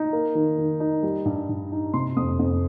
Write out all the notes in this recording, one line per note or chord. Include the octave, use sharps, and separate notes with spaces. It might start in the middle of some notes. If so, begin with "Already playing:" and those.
Already playing: D#4
A#3
D#3
D#3
D#4
G3
G2
G2
D#4
C3 C6
F2 D#6
F2